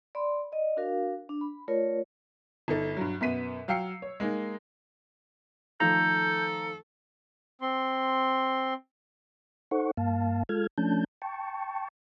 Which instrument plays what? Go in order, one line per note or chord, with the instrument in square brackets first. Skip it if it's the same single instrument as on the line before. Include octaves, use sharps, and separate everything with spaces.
[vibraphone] D5 B5 C6
D5 D#5
D4 F#4 A#4 F5
D4
B5
A3 F4 A#4 C#5 D5
[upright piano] G1 D#4 A4
G2 F#3
F#2 B2 B3 B6 D#7
F#3 F5 G5 E6 C7 C#7
C#5
G#3 A#3 D#4
[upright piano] D#3 F3 A3 [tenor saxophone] A4 [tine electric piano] A#5 [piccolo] G6
[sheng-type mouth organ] C4 C6
[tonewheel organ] D#4 A4 C5 F#5 C#6
G2 A#3 F5 A5
G#3 F4 A4 F6 G#6
F3 A3 C#4 D4 A5 G6
G5 A5 C#6